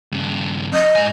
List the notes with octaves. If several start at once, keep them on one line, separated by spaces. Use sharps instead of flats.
G2 C#3
D#5
G#2 G#5